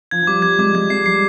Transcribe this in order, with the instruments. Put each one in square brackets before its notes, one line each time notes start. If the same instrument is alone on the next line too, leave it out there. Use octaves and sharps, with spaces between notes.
[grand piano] F3 [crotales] G#6
[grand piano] F3
[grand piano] G3 [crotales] D6
[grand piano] G3 [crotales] G#6
[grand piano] G#3 [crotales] D6
[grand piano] G#3 [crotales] G#6
[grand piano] G#3 [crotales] C7
[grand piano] G3 [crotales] C7